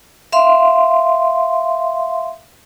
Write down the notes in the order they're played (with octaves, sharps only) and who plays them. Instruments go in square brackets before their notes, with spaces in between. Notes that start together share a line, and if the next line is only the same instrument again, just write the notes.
[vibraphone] E5 F5 C6